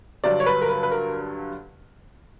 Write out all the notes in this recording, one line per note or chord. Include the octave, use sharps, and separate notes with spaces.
G2 D3 F#3 D5
C#5
B4
A#4
B4
B4
A#4